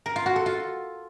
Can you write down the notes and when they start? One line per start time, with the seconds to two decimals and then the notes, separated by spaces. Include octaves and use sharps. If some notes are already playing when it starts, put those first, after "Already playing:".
0.06 A#4
0.16 F4
0.26 F#4
0.36 A4
0.46 F4